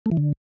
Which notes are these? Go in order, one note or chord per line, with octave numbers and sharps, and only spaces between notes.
A3
E3
D3